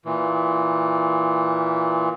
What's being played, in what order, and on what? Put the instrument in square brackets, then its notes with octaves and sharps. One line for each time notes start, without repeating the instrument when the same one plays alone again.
[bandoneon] A#2 E3